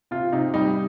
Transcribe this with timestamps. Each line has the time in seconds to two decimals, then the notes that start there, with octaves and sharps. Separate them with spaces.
0.11 C3 F4
0.33 C3 D#4
0.54 G3 D#4